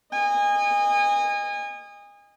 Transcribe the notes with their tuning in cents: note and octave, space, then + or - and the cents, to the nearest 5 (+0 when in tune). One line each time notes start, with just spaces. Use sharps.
D#5 -15 G#5 -30